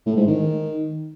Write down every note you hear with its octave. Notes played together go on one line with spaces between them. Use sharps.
A2
G#2
D#3